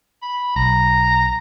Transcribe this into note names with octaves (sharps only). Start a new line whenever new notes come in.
B5
B1 A#5